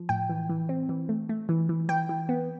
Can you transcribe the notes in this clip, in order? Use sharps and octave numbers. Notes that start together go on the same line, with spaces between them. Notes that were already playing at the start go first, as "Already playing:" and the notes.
Already playing: F3
A2 G5
E3
E3
C4
E3
A3
A3
E3
E3
E3 G5
E3
B3